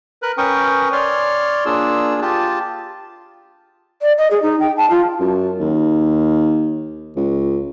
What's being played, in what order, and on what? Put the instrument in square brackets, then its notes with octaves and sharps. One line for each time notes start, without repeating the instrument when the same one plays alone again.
[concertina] A#4 B4 F#6
C#4 A#4 B4 G5 C#6 D#6
C#5 D5 C6 F6
A#3 D4 F4 G#4 E6
F4 G4 A5
[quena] D5
D#5
G#4
D#4
G5
A5
F4
[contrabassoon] F#2
D#2
C#2